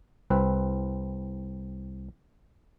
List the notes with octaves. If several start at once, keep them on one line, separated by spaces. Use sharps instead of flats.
C2 C4 B4